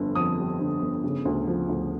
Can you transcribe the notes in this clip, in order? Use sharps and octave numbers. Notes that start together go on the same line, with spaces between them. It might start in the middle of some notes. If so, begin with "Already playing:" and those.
Already playing: G1 F2 D3
F2 D#6
G3
D3
G1
C#3
D2
F3
D2